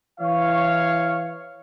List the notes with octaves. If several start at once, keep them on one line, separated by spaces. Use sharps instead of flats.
E3 C#5 F5